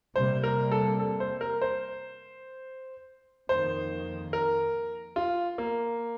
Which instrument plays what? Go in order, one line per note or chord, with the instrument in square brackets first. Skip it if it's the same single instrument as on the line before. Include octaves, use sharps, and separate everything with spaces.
[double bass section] C3 G3 A#3 [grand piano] C5
[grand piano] A#4
A4
A4
C5
A#4
C5
[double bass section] F2 D#3 A#3 [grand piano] C5
[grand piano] A#4
F4
A#3